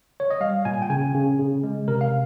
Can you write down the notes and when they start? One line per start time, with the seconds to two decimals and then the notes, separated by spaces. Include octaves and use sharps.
0.20 C#5
0.31 D#5
0.41 G3 F5
0.65 A#2 G#5
0.82 G5
0.90 C#3 G#5
1.14 C#3
1.39 C#3
1.64 G#3
1.88 C3 A#4
2.01 F5